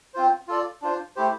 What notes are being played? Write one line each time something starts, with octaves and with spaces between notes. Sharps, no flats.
C4 F4 C5
F4 A4 D5
D4 F4 C5
A3 E4 G4 C5